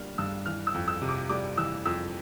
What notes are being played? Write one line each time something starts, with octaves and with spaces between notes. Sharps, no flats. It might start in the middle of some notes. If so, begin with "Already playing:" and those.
Already playing: D3 G3 A#3 F6
G2 E6
E3 F6
E6
F2
E6
C3
D6
G3 D6
E3 E6
F2 E6